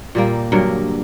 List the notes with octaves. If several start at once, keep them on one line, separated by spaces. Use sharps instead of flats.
A#2 G3 A#3
G2 D3 F#3 A#4